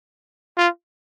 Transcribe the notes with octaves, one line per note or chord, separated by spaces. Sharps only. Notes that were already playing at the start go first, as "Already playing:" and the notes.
F4